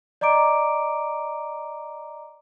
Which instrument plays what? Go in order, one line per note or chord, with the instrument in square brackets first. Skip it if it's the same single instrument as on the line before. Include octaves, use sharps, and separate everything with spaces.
[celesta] D5 D#5 A#5 D6 D7